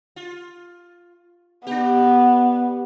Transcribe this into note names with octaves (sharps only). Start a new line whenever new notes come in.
F4
B3 D4 G4